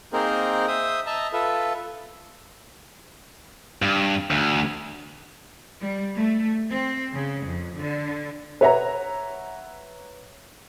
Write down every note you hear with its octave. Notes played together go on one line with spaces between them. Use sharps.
A#3 C4 D#4 G#4 A#4 C5
C5 E5 D#6
D#5 E5 A5 A#5
F4 A4 B4 E5
G2
D2
G3
A3
C4
C#3
F2
D3
B4 C#5 E5 F#5 A#5